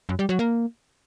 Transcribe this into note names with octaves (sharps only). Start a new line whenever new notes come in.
F#2
G3
F#3
A#3